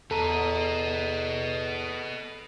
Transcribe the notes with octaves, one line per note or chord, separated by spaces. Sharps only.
E2 A4 B4 D#5 A#5